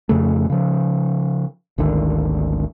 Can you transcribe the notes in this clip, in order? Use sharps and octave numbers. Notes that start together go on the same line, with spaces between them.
F2 C#3 A3
C#3 F3
G#1 D2 D3 D#3